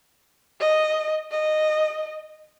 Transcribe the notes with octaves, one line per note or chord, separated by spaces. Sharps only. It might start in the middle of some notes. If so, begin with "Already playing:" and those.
D#5
D#5